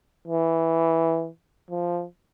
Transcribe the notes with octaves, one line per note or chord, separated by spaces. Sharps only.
E3
F3